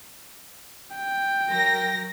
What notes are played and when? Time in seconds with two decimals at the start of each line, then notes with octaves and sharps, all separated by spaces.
0.96 G5
1.48 F#3 A#4 A#6